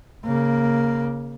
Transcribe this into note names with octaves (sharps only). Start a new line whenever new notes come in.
C#3 A#3